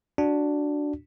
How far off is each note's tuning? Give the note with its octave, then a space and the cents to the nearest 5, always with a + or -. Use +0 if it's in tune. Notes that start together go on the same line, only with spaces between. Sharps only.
D4 +0 F#4 +0